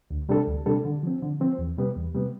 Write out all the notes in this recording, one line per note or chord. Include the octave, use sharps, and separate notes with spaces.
D2
C3 G3 D4 A4
D2
C3 G3 D4 A4
D3
F3 C4
D3
F3 C4
E2
C3 G3 B3
E2
C3 G3 B3